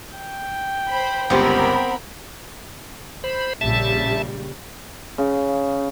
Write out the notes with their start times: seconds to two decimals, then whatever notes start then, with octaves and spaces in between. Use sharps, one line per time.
0.17 G5
0.91 C5 B5
1.30 G1 C#2 B3 C4 G4 A#4 B5
3.24 C5 B5
3.61 A#1 C#3 G3 E5 A5
5.18 C#3